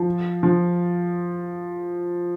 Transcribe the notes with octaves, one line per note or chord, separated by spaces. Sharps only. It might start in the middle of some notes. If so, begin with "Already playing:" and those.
Already playing: F3
F3